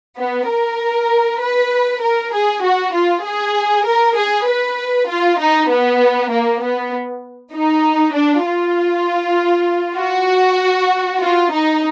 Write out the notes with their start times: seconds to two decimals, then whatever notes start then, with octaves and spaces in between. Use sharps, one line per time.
0.18 B3
0.49 A#4
1.41 B4
2.02 A#4
2.32 G#4
2.63 F#4
2.93 F4
3.24 G#4
3.85 A#4
4.16 G#4
4.47 B4
5.08 F4
5.39 D#4
5.69 B3
6.31 A#3
6.61 B3
7.53 D#4
8.14 D4
8.45 F4
9.98 F#4
11.21 F4
11.51 D#4